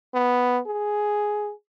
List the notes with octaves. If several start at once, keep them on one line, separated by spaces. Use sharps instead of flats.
B3
G#4